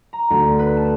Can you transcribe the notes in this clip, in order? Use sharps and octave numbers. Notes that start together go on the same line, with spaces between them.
A#5
D2
B4
A5